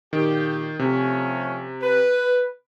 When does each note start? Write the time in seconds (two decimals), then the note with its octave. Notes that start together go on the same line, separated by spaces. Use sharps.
0.13 A#2 D#3 G4
0.79 C3 F3 A3 C#4
1.81 B4